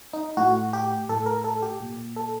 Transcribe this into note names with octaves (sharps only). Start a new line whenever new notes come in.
D#4
A2 F#4
G4
A2 A4
A#4
A4
G4
A#2
A4